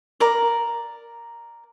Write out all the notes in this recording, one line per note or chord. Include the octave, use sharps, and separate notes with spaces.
A#4 D5